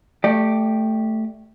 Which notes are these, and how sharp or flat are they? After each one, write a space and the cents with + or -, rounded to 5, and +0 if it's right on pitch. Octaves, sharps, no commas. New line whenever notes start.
A3 +0 G4 +0 D5 +35